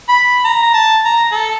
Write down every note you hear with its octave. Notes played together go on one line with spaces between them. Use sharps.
B5
A#5
A5
A#5
A4